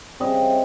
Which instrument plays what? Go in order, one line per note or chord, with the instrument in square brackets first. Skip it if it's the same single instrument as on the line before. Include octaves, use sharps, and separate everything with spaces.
[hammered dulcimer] C#3 E3 G3 C4 D#5